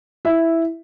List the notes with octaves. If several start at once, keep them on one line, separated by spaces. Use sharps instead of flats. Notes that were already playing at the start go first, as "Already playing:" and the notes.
E4 E5